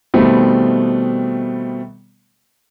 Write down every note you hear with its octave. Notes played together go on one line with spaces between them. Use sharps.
B2 D#3 G3 A3 B3 C4